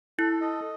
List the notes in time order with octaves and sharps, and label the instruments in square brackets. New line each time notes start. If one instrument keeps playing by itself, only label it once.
[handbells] E4 [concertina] A4
[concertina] D#5